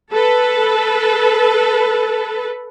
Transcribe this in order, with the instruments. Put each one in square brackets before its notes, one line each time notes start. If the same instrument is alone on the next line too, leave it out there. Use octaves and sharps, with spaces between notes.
[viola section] A4 B4